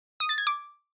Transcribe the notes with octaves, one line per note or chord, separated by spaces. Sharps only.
D#6
A6
G#6
D6